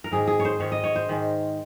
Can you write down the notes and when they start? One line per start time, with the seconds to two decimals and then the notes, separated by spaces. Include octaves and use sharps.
0.04 A#4
0.11 G#2 D#3 G#3 G#4
0.27 G#4
0.40 C#5
0.45 C5
0.60 G#2 D#3 G#3 C#5
0.72 D#5
0.84 C#5
0.96 C5
1.09 G#2 D#3 G#3